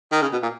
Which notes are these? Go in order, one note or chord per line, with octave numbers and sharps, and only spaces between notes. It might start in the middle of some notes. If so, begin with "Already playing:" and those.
D#3
C#3
B2
A#2